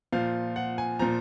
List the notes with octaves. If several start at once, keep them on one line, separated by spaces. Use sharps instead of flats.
A#2 F3 F5
F#5
G#5
A#2 F3 A#5